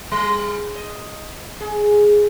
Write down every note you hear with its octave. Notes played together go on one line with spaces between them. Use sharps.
G3
D#5
G#4